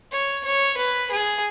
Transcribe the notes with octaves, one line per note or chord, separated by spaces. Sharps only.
C#5
C#5
B4
G#4